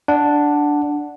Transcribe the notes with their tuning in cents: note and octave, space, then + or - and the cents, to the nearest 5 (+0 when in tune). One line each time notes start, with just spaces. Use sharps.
D4 +0 F#5 -5